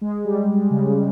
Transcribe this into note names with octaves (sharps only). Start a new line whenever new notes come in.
G#3
G3
C#3